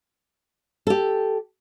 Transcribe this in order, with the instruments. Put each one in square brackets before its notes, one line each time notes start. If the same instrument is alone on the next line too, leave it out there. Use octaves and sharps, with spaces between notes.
[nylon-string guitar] G4 A4